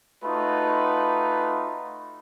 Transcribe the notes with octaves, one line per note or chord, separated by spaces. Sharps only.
A3 D#4 F4 F#4 B4